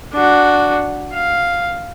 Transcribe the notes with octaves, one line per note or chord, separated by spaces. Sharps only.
D4 F#4
F5